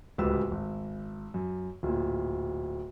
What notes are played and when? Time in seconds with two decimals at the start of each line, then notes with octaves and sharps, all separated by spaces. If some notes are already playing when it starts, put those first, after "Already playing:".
0.18 D1 C#2 G4 B4 E6
0.51 G#1
1.34 F#2
1.83 D1 A#2